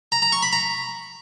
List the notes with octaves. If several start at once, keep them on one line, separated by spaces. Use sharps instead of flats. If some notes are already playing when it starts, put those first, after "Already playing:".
A#5
A#5
C#6
B5
A#5